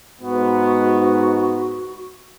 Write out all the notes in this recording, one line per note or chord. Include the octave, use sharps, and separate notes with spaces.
G#2 B3 F#4